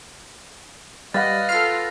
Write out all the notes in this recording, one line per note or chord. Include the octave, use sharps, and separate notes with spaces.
G3 B4 D#5 F5 F#5 A6 A#6
F4 A4 F6 C7